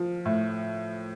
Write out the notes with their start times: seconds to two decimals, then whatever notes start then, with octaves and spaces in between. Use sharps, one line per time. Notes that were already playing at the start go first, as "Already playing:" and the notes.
Already playing: F3
0.25 A2